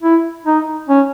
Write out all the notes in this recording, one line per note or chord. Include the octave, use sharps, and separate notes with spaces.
E4
D#4
C#4